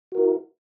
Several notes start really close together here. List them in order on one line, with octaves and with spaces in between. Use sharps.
F#4 A#4 E4